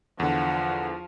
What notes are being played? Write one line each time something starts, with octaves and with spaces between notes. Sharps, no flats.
E2 D3 F3 F#5